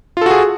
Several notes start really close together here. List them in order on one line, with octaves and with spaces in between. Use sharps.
F4 A4 F#4 G#4